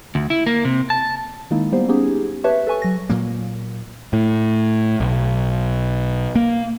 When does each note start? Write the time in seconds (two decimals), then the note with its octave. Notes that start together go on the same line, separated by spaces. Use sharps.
0.15 D2
0.30 E4
0.46 A#3
0.65 C3
0.90 A5
1.51 D#3 G#3 A#3 D#4 E4
1.72 G3 A#3 B3 G4 C5
1.88 B3 C#4 D#4 G4 G#4
2.44 G4 B4 C#5 E5 A5 C#6
2.67 A4 B4 G#5 C#6
2.82 F#3 A#6
3.09 A#2 F#3 A#3
4.13 A2
5.00 B1
6.36 A#3